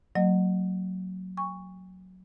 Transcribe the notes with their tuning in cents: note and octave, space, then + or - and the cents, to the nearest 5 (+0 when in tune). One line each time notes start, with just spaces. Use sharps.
F#3 +0 A#3 -30 D#5 -30
G#5 -40 C#6 +5